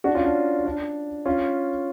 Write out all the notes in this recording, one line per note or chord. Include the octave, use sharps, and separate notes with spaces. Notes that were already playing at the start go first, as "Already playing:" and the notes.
D4 F#4
C#4 F4
D4
D4
C#4 F4